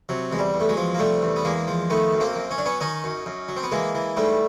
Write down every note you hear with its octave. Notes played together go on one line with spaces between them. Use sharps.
C3 F#3
E2 G#3
G3
E2
A3
F#3 G#3
F3
A#3
C3 G3 A3
E2
B3
E2 G#3 A#3
F3
D#3 A3 B3
F#2
A#3 C4
F#2
C#4
F#3 D4
B3 C#4
D#3 C#4 D#4
F#2
F#2
F#3
C4
B3
E3 G#3 A#3
E3
G#2 G3 A3